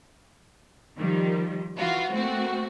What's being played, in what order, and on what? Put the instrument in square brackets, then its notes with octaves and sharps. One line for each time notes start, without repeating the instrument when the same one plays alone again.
[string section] D#3 F3 G3
E3 F4 F#4
A3 A#3 C4 F#4